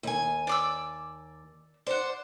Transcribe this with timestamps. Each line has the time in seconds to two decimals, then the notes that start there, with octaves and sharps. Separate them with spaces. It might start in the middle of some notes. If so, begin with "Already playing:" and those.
0.03 D#2 G#5
0.47 D5 D6 E6
1.87 C5 D5 F#5